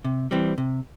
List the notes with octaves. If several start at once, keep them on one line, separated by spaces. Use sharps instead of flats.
C3
E3 G3 C4
C3